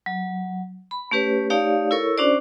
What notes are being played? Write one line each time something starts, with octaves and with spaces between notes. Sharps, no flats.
F#3
B5
A3 C#4 G4 B4 C#5
A3 D#4 G4 C#5 D5 F5
E4 A4 A#4 C#5 C#6 E6
C#4 D4 F#4 C5 D5